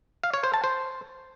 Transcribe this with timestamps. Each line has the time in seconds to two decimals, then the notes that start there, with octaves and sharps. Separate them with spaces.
0.23 F5
0.34 C#5
0.44 C5
0.54 A5
0.64 C5